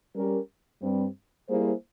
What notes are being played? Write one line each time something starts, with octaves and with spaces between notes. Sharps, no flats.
G3 C#4 G4 A#4
G2 G3 C4
G3 A#3 E4 G#4 C5